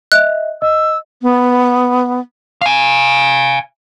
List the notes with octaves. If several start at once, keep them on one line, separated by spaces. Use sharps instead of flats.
D#5 E5 F#6
D#5 E6
B3
F5 G#5